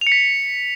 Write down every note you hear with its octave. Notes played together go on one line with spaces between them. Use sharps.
F7
C#7
B6